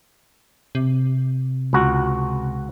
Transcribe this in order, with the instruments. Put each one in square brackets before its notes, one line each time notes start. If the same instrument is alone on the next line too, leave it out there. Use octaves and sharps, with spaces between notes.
[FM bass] C3
[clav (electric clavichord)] C#2 F#4